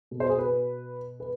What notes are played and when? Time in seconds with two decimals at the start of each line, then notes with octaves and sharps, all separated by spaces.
0.11 B2
0.20 C5
0.29 G#4
0.38 B4
1.20 B4